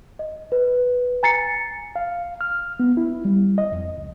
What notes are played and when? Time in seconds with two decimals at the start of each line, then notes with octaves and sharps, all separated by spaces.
0.19 D#5
0.52 B4
1.23 G#5 A#5 A6 C7 C#7
1.96 F5
2.41 F6
2.80 B3
2.97 E4
3.25 G3
3.58 D#5
3.72 F2
3.98 C#2